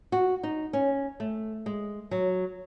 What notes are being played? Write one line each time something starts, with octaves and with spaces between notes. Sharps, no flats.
F#4
D#4
C#4
A3
G#3
F#3